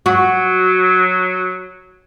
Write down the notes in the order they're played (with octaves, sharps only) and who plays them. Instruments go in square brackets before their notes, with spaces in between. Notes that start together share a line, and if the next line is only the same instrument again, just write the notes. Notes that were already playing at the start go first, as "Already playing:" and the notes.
[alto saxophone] F#3 [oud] F#4